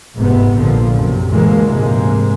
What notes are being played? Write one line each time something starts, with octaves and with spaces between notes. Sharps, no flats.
F1 G#2 C3 B3
A#1 A#2 D3 F3
F#2 C3
D2 A#2 D3 E3 G#3 A#3
G#2 C3 G#3 A#3